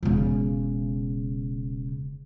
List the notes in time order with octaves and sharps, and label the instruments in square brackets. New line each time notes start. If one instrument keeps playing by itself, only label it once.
[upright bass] E1 C#3